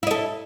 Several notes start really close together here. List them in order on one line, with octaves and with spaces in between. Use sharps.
E4 D#5 A4